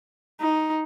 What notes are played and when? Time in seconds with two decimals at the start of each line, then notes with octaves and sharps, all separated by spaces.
0.41 D#4